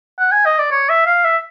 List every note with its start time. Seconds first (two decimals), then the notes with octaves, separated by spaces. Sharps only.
0.19 F#5
0.32 G#5
0.45 D#5
0.59 D5
0.71 C#5
0.89 E5
1.06 F5
1.24 E5